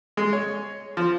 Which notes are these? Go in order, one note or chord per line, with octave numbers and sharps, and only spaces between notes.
G#3
C#5
F3